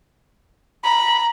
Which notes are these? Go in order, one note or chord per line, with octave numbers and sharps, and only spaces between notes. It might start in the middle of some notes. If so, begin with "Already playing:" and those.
A#5 B5